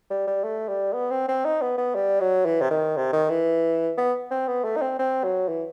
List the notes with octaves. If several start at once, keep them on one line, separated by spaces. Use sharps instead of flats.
G3
G3
A3
G3
B3
C4
C4
D#4
B3
B3
G3
F#3
E3
C3
D#3
C3
D#3
E3
B3
C4
B3
A3
D#4
C4
C4
F#3
E3